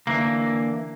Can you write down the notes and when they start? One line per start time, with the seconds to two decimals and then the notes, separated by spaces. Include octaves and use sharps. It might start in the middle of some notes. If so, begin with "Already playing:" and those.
0.07 D3 E3 A#3